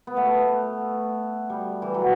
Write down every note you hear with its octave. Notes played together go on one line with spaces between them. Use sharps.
B3
A3
G3
E3
F#3